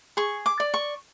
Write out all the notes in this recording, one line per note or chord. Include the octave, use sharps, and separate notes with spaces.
G#4 C#6
D6
D5
C#6